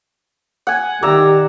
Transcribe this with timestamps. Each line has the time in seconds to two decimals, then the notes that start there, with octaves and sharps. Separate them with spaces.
0.67 F#5 G#5
1.02 D#3 G4 D5 E5 A#5